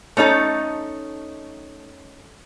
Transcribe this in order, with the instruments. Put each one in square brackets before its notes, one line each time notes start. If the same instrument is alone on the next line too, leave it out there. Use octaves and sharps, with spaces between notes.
[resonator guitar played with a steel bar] A3 C#4 D#4 A4